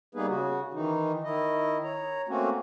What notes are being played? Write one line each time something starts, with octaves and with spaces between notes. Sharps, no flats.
G3 A#3 B3 D#4 G#4 B4
C#3 F#4
D#3 E3 D#4
D#3 E4 D#5
C#5 A#5
A3 A#3 C4 C#4 F#4